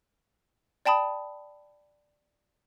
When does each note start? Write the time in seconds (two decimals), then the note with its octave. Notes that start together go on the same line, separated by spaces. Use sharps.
0.86 D5 G5 A5 B5 D#6